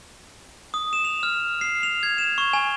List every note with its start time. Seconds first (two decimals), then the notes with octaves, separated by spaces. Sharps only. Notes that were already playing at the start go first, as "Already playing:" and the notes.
0.74 D#6
0.93 E7
1.05 F7
1.23 F6
1.61 C7
1.83 F7
2.03 G#6
2.18 E7
2.38 C#6
2.53 G#5